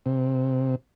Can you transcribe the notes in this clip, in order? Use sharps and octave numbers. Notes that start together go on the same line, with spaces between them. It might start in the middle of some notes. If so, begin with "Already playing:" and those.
C3